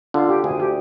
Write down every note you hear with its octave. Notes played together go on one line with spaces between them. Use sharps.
D3 F4
G4
D2 G#4
G4